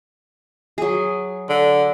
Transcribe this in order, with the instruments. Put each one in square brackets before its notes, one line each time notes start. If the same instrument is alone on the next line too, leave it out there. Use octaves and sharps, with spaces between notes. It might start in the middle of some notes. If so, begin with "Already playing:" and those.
[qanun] F#3 G#4
[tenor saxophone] D3